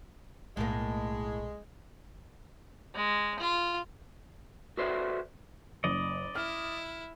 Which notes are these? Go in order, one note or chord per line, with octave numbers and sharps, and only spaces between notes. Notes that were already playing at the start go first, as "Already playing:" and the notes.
B1 A2 G#3 A#3
G#3
F4
F#4 A4 B4 C5 D5 E5
F#1 D5 D#5
E4 F6